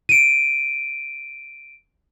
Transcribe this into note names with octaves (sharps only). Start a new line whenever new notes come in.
D7 D#7